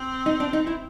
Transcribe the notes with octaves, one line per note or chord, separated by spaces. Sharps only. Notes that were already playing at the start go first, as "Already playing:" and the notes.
Already playing: C4
D#4
D4
D#4
E4